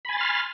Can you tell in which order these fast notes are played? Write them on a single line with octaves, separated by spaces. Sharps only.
B5 G#5 A6 C6 F6